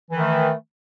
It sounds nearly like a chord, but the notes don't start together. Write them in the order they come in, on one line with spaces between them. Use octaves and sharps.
E3 D#3 A3